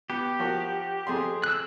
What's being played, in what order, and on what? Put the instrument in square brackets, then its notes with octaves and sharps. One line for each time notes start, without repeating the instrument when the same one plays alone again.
[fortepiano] B3 [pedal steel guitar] G4
[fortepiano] F3 F#4 A#4
F2 G#4 C6
[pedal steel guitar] E6 F#6